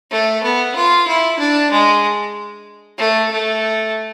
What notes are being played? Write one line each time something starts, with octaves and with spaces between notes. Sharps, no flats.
A3
B3
F4
E4
D4
G#3
A3
A3